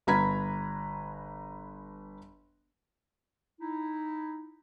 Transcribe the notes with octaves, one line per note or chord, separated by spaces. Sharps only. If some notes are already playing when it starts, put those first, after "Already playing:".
G1 B4 A#5 B5 G#6 B6
D#4 E4